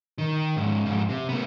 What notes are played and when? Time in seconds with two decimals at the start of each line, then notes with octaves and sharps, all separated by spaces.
0.18 D#3
0.56 C#2 G#2
0.86 F2 G#2
1.09 C3
1.29 A3 B3